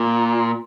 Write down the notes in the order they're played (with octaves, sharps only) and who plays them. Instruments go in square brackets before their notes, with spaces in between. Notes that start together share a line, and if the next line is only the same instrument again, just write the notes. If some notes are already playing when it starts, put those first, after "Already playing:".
Already playing: [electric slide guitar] A#2